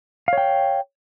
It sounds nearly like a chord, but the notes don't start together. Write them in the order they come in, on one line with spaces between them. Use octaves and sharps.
F5 C#5 G5